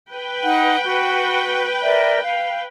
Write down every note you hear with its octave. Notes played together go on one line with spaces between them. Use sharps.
B4 G5
D#4 F#5
F#4
A#4 D5 E5
F5